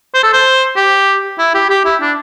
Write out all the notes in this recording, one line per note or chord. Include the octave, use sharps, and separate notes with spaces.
C5
A4
C5
G4
E4
G4
G4
E4
D4